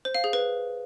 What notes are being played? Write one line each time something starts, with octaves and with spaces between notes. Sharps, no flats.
C5
F5
G#4
B4